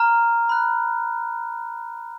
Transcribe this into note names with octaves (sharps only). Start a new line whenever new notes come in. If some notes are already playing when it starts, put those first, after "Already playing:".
Already playing: A#5 F6
B5 F#6